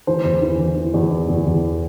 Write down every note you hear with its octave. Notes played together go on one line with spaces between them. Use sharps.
E3 C5
E2
E3
E3
E3
E2
E3
E2
E2